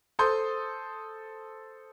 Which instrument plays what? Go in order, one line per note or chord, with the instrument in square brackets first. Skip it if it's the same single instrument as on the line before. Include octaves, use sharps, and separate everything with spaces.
[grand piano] A4 C5 C6 D#6 G6